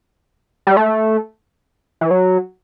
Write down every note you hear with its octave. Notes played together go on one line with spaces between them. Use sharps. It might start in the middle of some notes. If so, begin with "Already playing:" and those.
G3
A3
E3
F#3